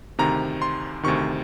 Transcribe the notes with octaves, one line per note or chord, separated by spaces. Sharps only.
D2 C3 D#3 A#5
C6
D2 C3 D#3 C#6